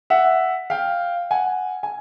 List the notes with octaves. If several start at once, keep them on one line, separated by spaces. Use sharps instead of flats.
E5 F#5
F5 G5
F#5 G#5
G#5